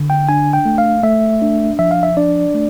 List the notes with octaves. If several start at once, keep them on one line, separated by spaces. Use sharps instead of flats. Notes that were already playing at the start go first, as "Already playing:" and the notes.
Already playing: D3
G5
D4 G#5
G5
A3
F5
A3 E5
D4
F3 E5
F5
E5
D4 D5
A3